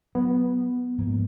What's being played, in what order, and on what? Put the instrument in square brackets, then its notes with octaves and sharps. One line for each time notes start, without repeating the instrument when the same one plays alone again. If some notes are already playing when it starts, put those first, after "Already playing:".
[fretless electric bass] F#3 [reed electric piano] B3
[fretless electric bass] G#2 F3 A#3